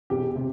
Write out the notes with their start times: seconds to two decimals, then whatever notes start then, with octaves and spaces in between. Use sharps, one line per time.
0.10 E1 G4
0.36 C3